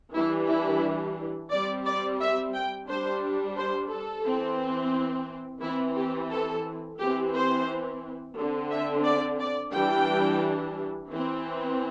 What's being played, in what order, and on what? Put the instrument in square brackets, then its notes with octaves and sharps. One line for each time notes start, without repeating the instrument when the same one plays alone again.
[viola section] E3 G3 D4 E4
E4
G3 C4 D5
D5
E5
G5
G3 D4 C5
C5
A4
E3 C4
E3 C4 E4
G4
A4
E3 C4 G4
C5
D3 C4
E5
D5
D5
E3 G3 D4 G5
E3 C4